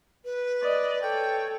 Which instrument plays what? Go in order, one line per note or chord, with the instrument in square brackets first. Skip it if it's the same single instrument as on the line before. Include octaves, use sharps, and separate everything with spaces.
[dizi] B4
[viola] D5 D#5
[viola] A4 C#5 [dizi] G5